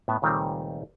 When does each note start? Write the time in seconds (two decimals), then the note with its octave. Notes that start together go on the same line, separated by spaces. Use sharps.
0.08 A2 B3 E5
0.22 C#2 A#2 D#3 G3 A3 C4